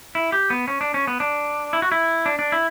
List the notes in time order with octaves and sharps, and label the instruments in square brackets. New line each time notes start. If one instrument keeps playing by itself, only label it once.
[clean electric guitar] E4
G4
B3
C#4
D4
C#4
B3
D4
E4
F#4
E4
D4
D4
E4